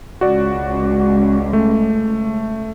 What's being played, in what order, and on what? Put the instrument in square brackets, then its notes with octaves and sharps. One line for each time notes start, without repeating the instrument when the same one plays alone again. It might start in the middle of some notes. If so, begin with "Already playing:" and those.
[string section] C#2 [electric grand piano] F#4 D5
[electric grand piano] A3